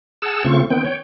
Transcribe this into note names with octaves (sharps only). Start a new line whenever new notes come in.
G#4 F#5 A5 E6
C#3 A3 C4 F4 C#6
D#3 B3 C4 G5
C#5 G5